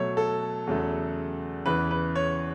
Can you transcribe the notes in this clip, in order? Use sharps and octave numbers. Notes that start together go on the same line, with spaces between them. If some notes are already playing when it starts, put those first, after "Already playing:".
Already playing: B2 F#3 A3 C#5
A4
E2 C#3 F#3 A3
E2 C#3 E3 B4
B4
C#5